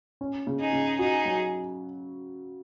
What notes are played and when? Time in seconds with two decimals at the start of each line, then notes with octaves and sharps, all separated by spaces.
0.21 C#4
0.47 C#3
0.60 D#4 G#4
0.73 C#3
0.99 D#4 F#4 G#4
1.25 F#3